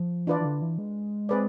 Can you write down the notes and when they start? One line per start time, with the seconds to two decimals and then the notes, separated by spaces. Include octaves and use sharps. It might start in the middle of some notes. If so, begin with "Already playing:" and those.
Already playing: F3
0.27 E3 D4 F4 B4 D5
0.40 E3
0.45 D3
0.62 E3
0.78 G#3
1.29 C4 G#4 B4 D5